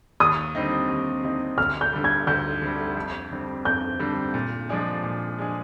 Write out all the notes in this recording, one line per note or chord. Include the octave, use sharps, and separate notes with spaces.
D#2 D#6
D3 G3 C4 D#4
D#2
D3 G3 C4 D#4
D2 F6
G6
D3 G3
G#6
D2 G6
D3 G3
F2
D3 G3 C4
F2 G6
D3 G3 C4
A#2
F3 G#3 D4 G#4
A#2
F3 G#3 D4 G#4